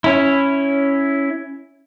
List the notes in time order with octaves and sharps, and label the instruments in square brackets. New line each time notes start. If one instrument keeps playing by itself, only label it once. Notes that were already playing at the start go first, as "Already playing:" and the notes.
[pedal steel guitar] C#4 E4